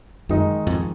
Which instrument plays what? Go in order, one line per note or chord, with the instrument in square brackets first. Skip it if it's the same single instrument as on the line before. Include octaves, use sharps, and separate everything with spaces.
[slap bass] F#2 [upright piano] D#3 G#3 D#4
[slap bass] F2 G#2